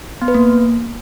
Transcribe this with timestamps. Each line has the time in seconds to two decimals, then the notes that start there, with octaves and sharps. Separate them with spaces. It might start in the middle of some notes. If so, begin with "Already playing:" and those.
0.22 B3
0.28 B4
0.35 A#3